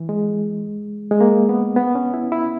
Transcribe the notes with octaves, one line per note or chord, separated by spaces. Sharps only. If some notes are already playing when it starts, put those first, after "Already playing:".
Already playing: E3
G#3
G#3
A#3
B3
B3
C#4
E4
E4